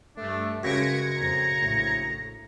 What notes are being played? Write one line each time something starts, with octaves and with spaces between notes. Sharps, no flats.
G2 A3 D4
F#2 C#3 G#3 B4 G5 G#6 A#6 C#7
F2 A#5
A#1 A2